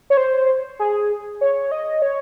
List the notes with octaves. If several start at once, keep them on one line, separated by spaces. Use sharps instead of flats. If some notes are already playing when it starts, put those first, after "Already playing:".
C#5
C5
G#4
C#5
D#5
C#5